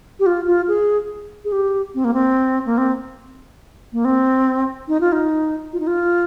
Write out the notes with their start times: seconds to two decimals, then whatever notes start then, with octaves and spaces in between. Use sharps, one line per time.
0.19 G4
0.26 F4
0.47 F4
0.68 G#4
1.44 G#4
1.52 G4
1.95 C4
2.04 A#3
2.14 C4
2.66 A#3
2.78 C4
3.93 A#3
4.05 C4
4.88 D#4
5.00 F4
5.12 D#4
5.73 F4
5.80 D#4
5.87 F4